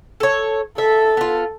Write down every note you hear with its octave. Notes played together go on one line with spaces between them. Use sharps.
A4 C#5
A4 E5
B3 F4